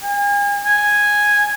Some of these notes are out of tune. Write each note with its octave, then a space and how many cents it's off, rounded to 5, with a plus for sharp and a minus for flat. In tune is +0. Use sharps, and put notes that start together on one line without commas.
G#5 -40
G#5 -5